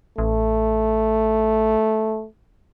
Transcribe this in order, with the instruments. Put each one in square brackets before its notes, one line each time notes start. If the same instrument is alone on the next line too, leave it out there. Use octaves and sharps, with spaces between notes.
[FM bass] A1 [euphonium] A3